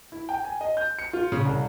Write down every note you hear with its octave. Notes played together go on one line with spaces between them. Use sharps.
E4
G5
G#5
D#5
G6
C#7
F4
C#3
C2